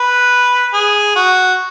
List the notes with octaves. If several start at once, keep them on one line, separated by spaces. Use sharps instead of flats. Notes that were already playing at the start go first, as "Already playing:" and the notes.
Already playing: B4
G#4
F#4